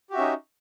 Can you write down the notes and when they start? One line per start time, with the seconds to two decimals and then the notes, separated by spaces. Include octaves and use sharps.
0.10 G4
0.13 F#4
0.15 E5
0.18 C#4
0.20 D#4